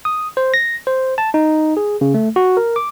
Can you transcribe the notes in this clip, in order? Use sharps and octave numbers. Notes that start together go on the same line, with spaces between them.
D#6
C5
A#6
C5
A5
D#4
G#4
C#3
A3
F#4
A#4
D6